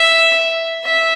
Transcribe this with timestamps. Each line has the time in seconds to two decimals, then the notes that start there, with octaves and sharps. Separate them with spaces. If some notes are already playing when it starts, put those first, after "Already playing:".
Already playing: E5
0.85 E5